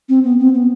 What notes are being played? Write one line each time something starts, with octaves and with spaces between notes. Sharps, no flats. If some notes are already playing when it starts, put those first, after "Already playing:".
C4
B3
C4
B3